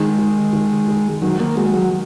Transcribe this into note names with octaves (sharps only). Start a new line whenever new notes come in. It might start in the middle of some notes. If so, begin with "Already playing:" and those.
Already playing: D#3 G#3
D#3
D#3
D#3
D#3 F#3
A#3
G#3 F#4
F#3